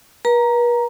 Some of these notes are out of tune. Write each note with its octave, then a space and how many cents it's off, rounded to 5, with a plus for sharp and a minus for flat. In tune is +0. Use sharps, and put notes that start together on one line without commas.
B4 -45 A#5 +0